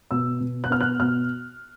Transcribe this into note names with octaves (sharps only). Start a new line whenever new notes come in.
B2 E6
B2
F#6
B3 F6
F#6
B2 F6